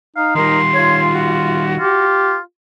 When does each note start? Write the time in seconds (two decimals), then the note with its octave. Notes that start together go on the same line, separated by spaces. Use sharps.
0.16 D#4 F5
0.36 D#3 G3 A#4 C6
0.73 F4 C#5
1.11 F#4
1.79 F4 G4